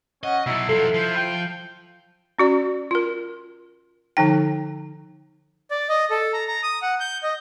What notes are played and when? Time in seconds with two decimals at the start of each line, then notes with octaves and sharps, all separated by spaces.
0.23 C#4 D#5 F#5
0.46 B2 F#3 E4 E6
0.69 F3 F#3 A4
0.94 F3 G6
1.16 G5
2.38 C#4 F#4 D5
2.91 F4 A#4
4.17 D3 F3 D#4 G5
5.71 D5
5.89 D#5
6.10 A4
6.33 A#5
6.48 A#5
6.63 D#6
6.82 F#5
7.00 G6
7.23 D#5